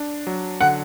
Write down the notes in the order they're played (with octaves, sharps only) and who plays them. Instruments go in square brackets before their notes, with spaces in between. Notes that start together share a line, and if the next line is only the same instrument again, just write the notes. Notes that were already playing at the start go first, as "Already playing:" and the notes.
Already playing: [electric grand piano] D4
F#3
[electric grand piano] D3 [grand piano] F#5